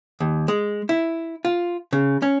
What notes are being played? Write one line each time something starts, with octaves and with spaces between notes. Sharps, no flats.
D#2
G#3
E4
F4
C#3
C#4